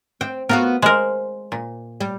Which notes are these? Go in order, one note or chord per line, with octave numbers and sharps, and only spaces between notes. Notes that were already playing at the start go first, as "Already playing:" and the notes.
C4 G5
B3 F4 F#4 A#4
G#3 A#4 C5
A#2
G3